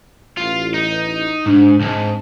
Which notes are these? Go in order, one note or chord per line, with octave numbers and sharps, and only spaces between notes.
A1 F4
D#4
G#2 D4
B1 G#2 C4 D4 A5